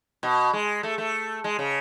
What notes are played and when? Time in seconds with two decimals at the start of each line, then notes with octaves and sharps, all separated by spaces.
0.23 B2
0.53 G#3
0.83 A3
0.98 A3
1.44 G#3
1.59 C#3